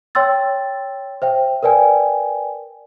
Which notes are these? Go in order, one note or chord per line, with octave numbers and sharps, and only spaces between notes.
C#5 G5 C6 E6 A6
C5 E5 G5
A#4 B4 D5 G5 G#5